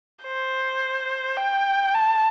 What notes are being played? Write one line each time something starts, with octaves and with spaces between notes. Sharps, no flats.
C5
G5
A5